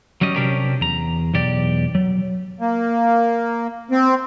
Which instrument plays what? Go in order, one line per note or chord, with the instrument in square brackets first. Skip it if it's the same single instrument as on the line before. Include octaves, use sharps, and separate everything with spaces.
[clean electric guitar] F#3 G3 C#4 D#5
C3 F#3 C#4 D4 G4 A#4
E2 A#5
B1 E2 G4 D5
F#3
[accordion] A#3
C4